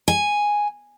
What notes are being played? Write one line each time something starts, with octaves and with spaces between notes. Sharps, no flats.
G#5